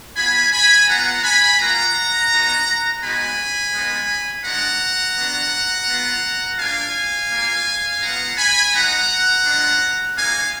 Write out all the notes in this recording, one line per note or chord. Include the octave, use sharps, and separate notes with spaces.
B3 F4 G#5 B5
G#5 B5
B3 F4 F#5 A#5
G#5 B5
A#3 F4 F#5 A#5
B3 D#4 F#4
G#3 B3 D#4 F#4 G#5 B5
G#3 B3 D#4
G#3 D4 F#4 F#5 A#5
B3 D4 F#4
B3 F4
A#3 D4 F4 F5 G#5
A#3 F4
B3 F4 F#5 A#5
G#5 B5
G#3 D#4 F#4 F#5 A#5
G#3 D4 F4
A#3 D#4 F#4 F5 G#5